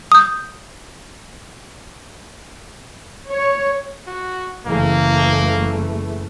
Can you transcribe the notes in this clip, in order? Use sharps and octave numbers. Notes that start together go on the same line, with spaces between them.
D#6 G6
C#5
F#4
F#1 E3 A3 A#3